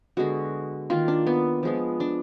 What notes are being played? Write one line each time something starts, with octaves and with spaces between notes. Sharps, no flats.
D3 G#3 B3 F#4
D#3 A#3 F4
D4
B3
F3 G#3 B3
D4